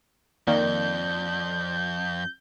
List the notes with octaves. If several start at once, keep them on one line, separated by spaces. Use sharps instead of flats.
F2 D#3 A#3 D5 G6